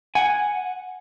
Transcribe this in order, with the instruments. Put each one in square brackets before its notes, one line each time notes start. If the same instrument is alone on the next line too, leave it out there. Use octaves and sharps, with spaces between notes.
[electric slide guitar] F#5 [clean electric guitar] G#5